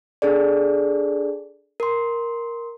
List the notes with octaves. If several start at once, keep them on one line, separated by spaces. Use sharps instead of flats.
D4 G#4 A4 D5
A#4 C6